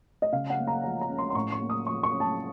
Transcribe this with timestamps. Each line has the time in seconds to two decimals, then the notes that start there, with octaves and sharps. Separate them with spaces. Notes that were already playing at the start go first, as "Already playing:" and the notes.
0.22 D#5
0.32 C#3 F5
0.50 F#5
0.58 A#3
0.67 A#5
0.84 F3 F#5
1.01 A#5
1.09 C#4
1.18 C6
1.30 C6
1.35 A2 C#6
1.52 C#6
1.61 A#3
1.70 D#6
1.86 F3 C#6
2.03 C#6
2.12 C#4
2.20 A5